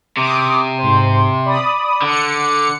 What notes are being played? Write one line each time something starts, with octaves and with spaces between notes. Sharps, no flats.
C3 D6 D#6
G#2 C5
D5 B5 D#6
D3 F#5 C#7